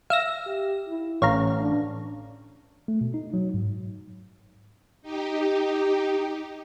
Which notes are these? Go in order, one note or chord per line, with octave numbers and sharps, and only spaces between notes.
E5 F5 E6 A#6
G4
E4
A1 C#4 C#5 F5 A#5
D4
A3
B2
D#4
F#3
G#2
D#4 G4